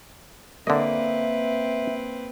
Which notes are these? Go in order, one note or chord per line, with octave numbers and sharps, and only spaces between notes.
D3 A#3 C4 B4 D#5 E5